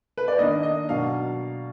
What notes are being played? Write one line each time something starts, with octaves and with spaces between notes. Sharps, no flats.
B4
D5
D#3 A#3 D4 D#5
D#5
B2 F#3 A#3 D4 F5